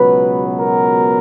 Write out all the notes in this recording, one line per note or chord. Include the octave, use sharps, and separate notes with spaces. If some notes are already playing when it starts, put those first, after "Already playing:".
Already playing: C#2 B2 F#3 B3 B4
A#4